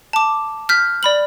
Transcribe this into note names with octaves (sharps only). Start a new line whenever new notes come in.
A5 D6
F6 G6 B6
D5 B5 F#7